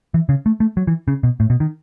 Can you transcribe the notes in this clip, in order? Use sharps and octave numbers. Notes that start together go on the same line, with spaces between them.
E3
C#3
A3
A3
F#3
E3
C#3
B2
A2
B2
D#3